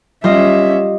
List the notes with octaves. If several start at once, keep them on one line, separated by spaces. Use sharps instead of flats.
G3 C#4 F4 D#5 E5